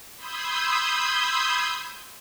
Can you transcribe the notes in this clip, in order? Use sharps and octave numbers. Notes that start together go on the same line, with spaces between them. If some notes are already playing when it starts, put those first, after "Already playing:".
B5 C6 D#6 E6 G6 G#6